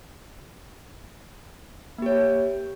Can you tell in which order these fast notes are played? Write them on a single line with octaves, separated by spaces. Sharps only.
A#3 G4 C#5